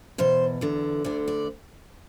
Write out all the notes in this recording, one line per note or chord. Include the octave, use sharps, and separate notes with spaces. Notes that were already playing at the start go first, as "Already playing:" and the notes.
E2 B2 C5
E2 D3
D2 D3 D5
D5